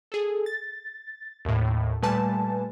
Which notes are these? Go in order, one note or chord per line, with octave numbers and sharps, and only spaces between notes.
G#4 A4
A6
D#2 A2
A#2 G3 A3 B4 G#5 A5